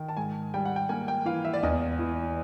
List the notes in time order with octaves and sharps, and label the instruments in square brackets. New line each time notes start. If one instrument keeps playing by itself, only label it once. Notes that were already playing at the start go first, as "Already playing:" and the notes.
Already playing: [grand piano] D#3
A5
G#2 G#5
G3 G5
F#5
G5
A#3 G#5
G5
E3 F5
E5
D5
E2 D#5
E3